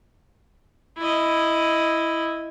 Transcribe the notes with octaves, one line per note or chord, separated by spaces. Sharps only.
E4 D#5